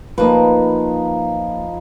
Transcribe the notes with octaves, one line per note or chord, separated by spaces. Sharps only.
F3 A#3 D#4 B4 B5